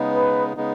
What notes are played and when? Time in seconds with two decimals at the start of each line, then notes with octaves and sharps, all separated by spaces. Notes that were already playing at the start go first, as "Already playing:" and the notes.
Already playing: C#3 G#3 B3 D#4
0.14 B4
0.57 C#3 G#3 B3 D#4